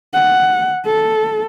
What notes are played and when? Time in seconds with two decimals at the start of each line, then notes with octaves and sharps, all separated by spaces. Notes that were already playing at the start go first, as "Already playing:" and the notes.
0.14 F#5
0.86 A4